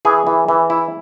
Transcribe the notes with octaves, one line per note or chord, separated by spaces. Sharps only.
E3 G#4
E3
E3
E4